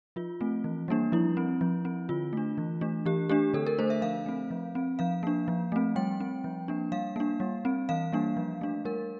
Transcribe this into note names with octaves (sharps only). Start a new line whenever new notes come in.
F3 F4
A3 C4
E3
G3 A#3 D4
F3 E4
C4
F3
C4
D3 F4
A3 D4
E3
A3 D4
E3 G4
A3 D4 G4
D3 A4
A#4
A3 D4 C5
E5
F3 F5
A3 C4
F3
C4
F3 F5
A#3 D4
F3
A3 C4
G3 G5
C4
F3
A#3 D4
G3 F5
A#3 D4
G3
C4
E3 F5
G3 A#3 D4
F3
A3 D4
G3 A#4